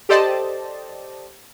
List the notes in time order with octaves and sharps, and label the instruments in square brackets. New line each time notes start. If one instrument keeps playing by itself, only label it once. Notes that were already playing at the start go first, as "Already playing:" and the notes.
[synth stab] G4 A4 C5 D5 D#5 A5